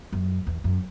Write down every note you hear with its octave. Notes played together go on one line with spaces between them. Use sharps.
F#2
E2
F#2